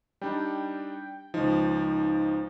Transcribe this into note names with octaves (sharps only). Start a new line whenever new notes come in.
G3 D4 D#4 G5
C#2 F3 D#4